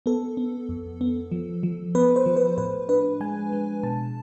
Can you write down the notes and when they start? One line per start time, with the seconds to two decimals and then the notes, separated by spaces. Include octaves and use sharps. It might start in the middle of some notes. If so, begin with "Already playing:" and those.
0.06 B3 A4
0.37 B3
0.69 F2
1.01 B3
1.32 F3
1.63 F3
1.95 B3 B4
2.16 C5
2.26 F3
2.37 B4
2.58 A2 B4
2.89 D4 B4
3.20 G#3 G#5
3.53 G#3
3.83 B2 A5